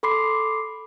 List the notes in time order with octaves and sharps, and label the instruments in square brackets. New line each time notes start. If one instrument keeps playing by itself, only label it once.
[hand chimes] A4 B5 C6 D6 C7